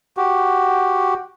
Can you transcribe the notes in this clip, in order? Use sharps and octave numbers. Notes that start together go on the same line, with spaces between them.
F#4 G4